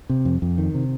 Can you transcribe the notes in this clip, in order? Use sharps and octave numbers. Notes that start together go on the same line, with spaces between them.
C3
F2
F2
D#3
C3